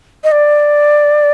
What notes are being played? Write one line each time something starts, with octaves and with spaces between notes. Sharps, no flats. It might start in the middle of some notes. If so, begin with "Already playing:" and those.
D#5
D5